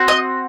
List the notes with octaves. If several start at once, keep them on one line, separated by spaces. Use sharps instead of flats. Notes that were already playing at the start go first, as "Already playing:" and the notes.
Already playing: C4 F#4
D#5